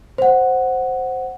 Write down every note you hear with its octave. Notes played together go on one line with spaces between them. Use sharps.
C5 F#5